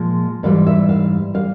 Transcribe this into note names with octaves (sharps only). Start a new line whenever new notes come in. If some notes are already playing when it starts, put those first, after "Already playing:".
Already playing: A#2 F3 G#3
G#2 E3 G3 F5
E5
F5
G3 F5